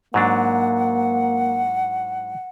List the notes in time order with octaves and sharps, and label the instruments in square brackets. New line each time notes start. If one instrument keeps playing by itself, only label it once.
[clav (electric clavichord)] G#2 F#3 D4 [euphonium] A#3 [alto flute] F#5